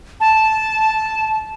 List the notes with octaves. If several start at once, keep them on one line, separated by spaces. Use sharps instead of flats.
A5